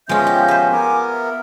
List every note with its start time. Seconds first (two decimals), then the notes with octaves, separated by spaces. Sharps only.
0.09 F3 G#3 B3 C#4 F4 D#5 E5 G6
0.27 G4
0.48 B4 C5
0.72 B3 A#4 G#5 D6
1.11 E5